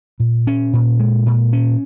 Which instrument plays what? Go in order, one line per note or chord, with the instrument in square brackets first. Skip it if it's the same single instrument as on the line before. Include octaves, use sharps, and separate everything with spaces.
[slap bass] A#2
C#4
A#2
G#3
A#2
C#4